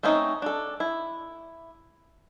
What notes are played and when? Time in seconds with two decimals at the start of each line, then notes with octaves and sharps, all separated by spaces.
0.03 A3 C4 C#4 D#4
0.42 D4 A4
0.80 E4